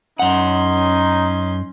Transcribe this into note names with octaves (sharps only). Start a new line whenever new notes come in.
F#2 C#4 D#4 F#5 C6